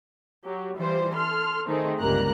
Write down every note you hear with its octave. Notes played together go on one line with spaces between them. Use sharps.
F#3 G4
E3 G3 F4 C5
A4 C6 F6
D#3 A3 C4 D#4 G#4
G1 C#2 G3 A#3 A#5 F#6